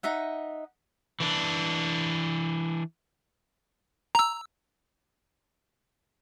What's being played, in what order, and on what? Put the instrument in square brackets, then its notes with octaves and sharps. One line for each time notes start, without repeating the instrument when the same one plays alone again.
[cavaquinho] D#4 D#5 E5 F#5
[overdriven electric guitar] E3 D4
[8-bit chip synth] A#5 E6